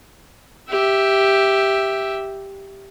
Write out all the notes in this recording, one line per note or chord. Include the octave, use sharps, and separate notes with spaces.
G4 E5